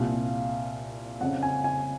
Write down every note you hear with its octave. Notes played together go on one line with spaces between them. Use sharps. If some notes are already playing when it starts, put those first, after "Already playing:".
Already playing: C2 A#2 F5
F2 C#3 F#5
G#5
G#5